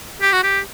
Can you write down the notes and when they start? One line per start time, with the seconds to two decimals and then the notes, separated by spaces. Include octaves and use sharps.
0.22 G4
0.33 F#4
0.43 G4